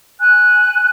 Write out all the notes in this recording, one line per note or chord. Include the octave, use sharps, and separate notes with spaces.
G#5 F#6